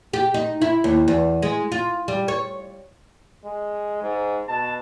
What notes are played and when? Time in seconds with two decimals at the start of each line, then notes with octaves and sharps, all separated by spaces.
0.13 G4
0.34 D#4
0.62 E4
0.84 D#2
1.08 E2
1.42 G#3
1.72 F4
2.08 G3
2.28 C#5
3.45 G#3
4.02 G#2
4.48 B2 A5